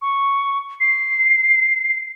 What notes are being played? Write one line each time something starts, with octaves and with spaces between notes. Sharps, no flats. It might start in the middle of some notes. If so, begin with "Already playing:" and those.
C#6
C7